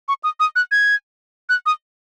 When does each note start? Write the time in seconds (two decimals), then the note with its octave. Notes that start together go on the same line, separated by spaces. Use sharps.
0.08 C#6
0.24 D#6
0.40 D#6
0.56 F#6
0.72 G#6
1.49 F#6
1.66 D#6